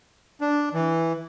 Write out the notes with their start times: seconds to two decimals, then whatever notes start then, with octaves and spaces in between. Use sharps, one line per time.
0.41 D4
0.73 E3